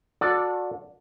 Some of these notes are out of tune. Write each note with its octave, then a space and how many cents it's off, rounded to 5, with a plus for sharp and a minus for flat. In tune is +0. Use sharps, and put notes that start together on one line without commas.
F#4 -30 A4 +15 D5 +0